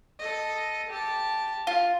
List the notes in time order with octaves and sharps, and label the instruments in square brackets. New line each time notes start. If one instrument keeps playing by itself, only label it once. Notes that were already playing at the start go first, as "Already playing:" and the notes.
[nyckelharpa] A4 D#5
G4 A5
[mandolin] F4